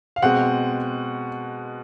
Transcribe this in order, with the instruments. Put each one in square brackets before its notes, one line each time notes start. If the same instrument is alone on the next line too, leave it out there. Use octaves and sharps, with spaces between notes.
[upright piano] F5
B2 G#3 C4 F#5